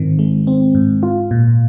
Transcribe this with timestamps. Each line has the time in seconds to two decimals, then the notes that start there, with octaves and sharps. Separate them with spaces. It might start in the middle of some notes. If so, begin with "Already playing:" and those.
Already playing: G#2 D#3 C4
0.19 G#3
0.47 C4
0.75 G#2
1.03 F4
1.31 A#2